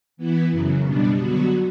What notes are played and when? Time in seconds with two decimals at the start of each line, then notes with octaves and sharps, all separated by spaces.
0.17 E3 B3 E4
0.51 F#2 C#3 F#3
0.85 B2 G3 B3 D4
1.19 D3 F#3 B3 F#4